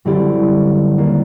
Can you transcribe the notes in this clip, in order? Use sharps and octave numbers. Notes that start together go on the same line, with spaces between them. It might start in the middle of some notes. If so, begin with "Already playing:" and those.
F#2 D3 G3 C4 E4 G4
D#2 D#3 G3 A#3